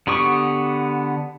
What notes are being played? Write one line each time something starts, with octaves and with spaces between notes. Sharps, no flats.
D3 B3 G4 C#6 D#6